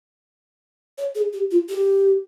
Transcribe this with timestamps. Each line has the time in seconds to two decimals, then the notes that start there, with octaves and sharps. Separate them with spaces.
0.98 C#5
1.15 G#4
1.33 G4
1.51 F4
1.69 G4